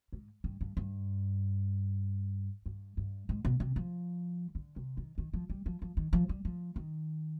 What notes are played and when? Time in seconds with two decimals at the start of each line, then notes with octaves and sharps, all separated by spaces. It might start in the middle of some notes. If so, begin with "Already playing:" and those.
0.13 G#2
0.44 G2
0.61 G2
0.77 G2
2.66 G2
2.97 G2
3.29 G#2
3.45 B2
3.60 C3
3.76 F3
4.55 D3
4.76 C3
4.97 D#3
5.18 D#3
5.34 F3
5.50 G3
5.66 F3
5.82 F3
5.97 D#3
6.13 F3
6.29 G3
6.45 F3
6.76 D#3